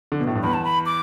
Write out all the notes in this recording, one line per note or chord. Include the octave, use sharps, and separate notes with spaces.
D3
B2
A2
G2
E2 B5
A5
B5
D6